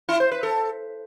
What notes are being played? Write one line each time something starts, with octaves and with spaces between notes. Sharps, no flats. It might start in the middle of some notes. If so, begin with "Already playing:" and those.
E4
C5
B4
A4